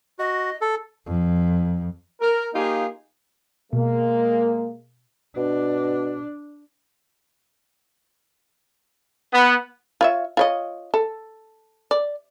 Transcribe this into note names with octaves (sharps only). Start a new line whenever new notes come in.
F#4 D#5
A4
F2
A#4
A#3 D#4 F4 G4 G#4
B2 G#3 A#3
B2 D4
B3
F4 C#5 E5
F4 C#5 D#5
A4
D5